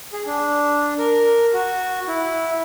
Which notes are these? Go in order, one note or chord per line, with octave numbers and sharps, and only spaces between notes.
G#4
D4
A#4
F#4
E4